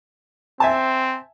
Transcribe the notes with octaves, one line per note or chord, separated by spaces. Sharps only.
C4 E5 G#5 A5